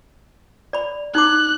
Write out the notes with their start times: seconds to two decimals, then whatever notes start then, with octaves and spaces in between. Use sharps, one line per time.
0.73 D5 B5
1.15 D#4 E4 D6 F#6